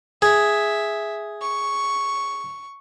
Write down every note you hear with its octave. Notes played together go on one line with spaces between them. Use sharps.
G#4 E5
C#6